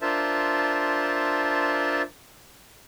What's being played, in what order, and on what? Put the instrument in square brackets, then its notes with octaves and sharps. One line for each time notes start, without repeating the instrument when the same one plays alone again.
[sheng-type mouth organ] D4 F4 A#4 C5 E5 A5